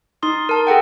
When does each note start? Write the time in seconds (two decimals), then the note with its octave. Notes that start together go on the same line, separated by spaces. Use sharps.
0.23 D#4 C6 D#6
0.49 A#4 A5
0.67 G#4 A4 F#5 G5